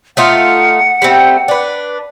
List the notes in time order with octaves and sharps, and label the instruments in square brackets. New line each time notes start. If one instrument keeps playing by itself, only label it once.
[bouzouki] A3 D#4 F4 [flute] F#5
[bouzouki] G3 A3 C4
D4 B4